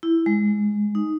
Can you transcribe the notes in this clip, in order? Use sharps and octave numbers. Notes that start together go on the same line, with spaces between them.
E4
G#3
D#4